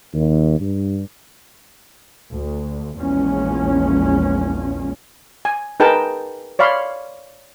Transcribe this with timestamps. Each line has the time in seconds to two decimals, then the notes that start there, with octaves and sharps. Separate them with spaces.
0.13 D#2
0.60 G2
2.32 D2
2.98 A#1 E2 F3 G#3 A#3 C#4
5.45 G#5
5.80 D#4 G#4 A#4 B4 G5 A5
6.59 C#5 D5 F5 B5 C6